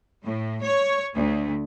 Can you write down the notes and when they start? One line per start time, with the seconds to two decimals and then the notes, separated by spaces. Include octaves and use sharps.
0.24 A2
0.62 C#5
1.14 D2